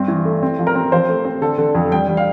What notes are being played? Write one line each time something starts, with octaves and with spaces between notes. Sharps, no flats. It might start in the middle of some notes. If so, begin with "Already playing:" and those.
Already playing: G2 C4
E3
A3
C4
F3
A#4
C4
F3 C5
A3
C4
D3 A4
D3
F2
G3 G5
G3
F5